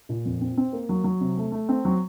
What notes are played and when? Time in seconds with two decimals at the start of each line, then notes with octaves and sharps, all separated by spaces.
0.09 A#2
0.26 F2
0.41 C4
0.57 C4
0.73 A#3
0.89 F#3
1.04 F#3
1.21 C3
1.37 A3
1.52 A3
1.69 C4
1.85 F#3